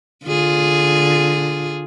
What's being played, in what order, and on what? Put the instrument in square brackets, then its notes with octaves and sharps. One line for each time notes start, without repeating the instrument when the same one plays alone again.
[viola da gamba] D3 F4 G#4